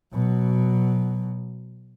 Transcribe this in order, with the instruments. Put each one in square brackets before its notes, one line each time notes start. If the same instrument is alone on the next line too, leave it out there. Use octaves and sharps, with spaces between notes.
[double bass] B2 F#3